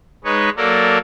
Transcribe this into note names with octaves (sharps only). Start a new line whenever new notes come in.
G#3 D#4 B4 C#5
F#3 A#3 A4 A#4 D5